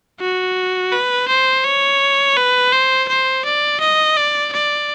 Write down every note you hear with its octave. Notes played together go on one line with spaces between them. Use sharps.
F#4
B4
C5
C#5
B4
C5
C5
D5
D#5
D5
D5